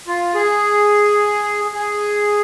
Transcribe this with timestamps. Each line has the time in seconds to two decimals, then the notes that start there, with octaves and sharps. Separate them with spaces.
0.07 F4
0.35 G#4
1.74 G#4